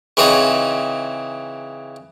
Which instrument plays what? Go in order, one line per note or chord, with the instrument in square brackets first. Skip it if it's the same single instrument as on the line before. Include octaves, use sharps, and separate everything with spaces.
[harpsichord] C#3 E3 C4 D#4 G#4